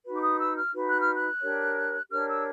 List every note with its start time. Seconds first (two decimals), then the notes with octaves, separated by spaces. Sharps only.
0.05 D#4 F#4 B4
0.14 D6
0.22 D#6
0.40 E6
0.56 F6
0.73 D#4 F#4 B4
0.88 F#6
1.00 F6
1.14 F#6
1.42 D4 G4 A#4 C#5
2.11 D4 G4 A#4 C#5 F6
2.28 E6